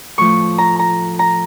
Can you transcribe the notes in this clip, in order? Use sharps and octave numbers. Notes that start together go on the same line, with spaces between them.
A2 F3 A3 C#6
A#5
A#5
A#5